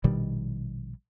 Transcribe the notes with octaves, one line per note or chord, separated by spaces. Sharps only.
A#1 B2 D#3 G3